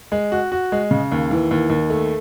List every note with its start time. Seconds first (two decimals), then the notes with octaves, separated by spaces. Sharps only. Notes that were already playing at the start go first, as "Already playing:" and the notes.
0.12 G#3
0.32 F#4
0.52 F#4
0.72 G#3
0.91 C#3
1.12 D#2
1.31 E3
1.51 D#2
1.70 D#2
1.90 A3